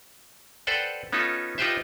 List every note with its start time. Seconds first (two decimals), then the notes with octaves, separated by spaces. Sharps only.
0.67 A4 B4 C5 D5 F#5 G5
1.12 B3 C#4 D#4 F4 A4
1.58 D#4 F4 G4 B4 C5 E5